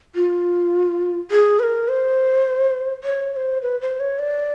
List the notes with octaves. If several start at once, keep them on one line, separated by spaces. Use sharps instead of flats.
F4
G#4
B4
A#4
C5
C#5
C#5
C5
B4
C5
C#5
D5